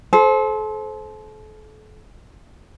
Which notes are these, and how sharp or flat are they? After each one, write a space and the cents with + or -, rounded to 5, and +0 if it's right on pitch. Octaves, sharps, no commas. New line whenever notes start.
A4 -35 C5 +5